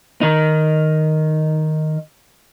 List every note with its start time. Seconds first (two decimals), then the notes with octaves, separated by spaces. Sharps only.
0.21 D#3 D#4